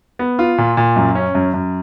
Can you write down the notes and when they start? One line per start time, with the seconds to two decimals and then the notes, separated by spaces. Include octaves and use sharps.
0.19 B3
0.39 F4
0.58 A#2
0.77 A#2
0.96 F#2
1.15 C#4
1.35 F#2
1.54 F#2